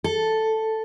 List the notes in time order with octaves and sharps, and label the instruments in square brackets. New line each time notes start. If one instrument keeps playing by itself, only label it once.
[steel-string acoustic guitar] A4